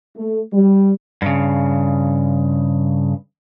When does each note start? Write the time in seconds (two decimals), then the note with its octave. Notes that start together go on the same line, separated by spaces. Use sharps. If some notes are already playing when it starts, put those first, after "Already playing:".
0.16 A3
0.53 G3
1.22 G2 C#3